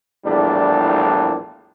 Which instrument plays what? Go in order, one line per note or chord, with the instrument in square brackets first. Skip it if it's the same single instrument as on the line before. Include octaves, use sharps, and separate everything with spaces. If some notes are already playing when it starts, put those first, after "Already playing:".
[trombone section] A#1 E2 A2 G3 D4